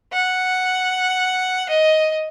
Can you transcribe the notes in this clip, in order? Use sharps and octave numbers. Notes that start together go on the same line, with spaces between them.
F#5
D#5